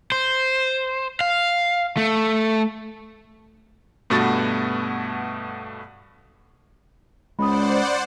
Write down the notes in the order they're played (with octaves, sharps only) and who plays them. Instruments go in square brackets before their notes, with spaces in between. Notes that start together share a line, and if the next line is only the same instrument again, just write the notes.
[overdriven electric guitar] C5
F5
A3
[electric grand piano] G2 B2 A3 B3 F#4 A6
[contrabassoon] C#2 [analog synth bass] G#3 [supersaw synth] C5 D5 F#5 [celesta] B5 D#6